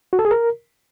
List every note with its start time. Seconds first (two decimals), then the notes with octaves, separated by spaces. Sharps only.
0.13 F#4
0.19 A4
0.25 G#4
0.31 A#4